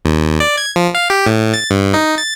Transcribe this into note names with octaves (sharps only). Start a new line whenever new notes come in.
D#2
D5
G#6
F3
F5
G4
A2
A6
G2
D#4
A6